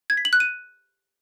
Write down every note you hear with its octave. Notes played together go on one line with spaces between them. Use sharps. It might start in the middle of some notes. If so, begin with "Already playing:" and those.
G#6
B6
F#7
F#6
D#7